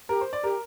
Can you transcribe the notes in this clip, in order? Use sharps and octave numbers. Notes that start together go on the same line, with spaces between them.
G4 A#4
C5
D5
G4 A#4